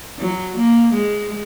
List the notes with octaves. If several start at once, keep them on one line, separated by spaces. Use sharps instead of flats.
F#3
A#3
G#3